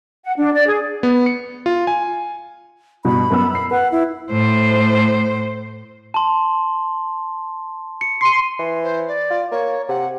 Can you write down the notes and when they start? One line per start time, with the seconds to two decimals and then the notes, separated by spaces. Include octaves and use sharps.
0.24 F#5
0.37 D4
0.53 D5
0.67 G#4
1.03 B3
1.26 C#7
1.66 F4
1.87 G#5
3.05 G2 B2 B5
3.30 F#2 B3 E6
3.55 C7
3.71 B4 F#5
3.92 E4
4.31 A2 C5
6.14 A5 C6
8.01 C#7
8.21 C6 C7 D#7
8.59 E3
8.84 C5
9.08 D5
9.30 F4
9.52 A#3 C#5
9.89 C3 F#5